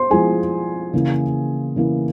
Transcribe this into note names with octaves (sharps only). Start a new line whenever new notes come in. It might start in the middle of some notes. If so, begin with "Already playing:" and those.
Already playing: C5 C6
F3 G#3 E4 G#4 G#5
C#3 E3 A#3
C#3 E3 A#3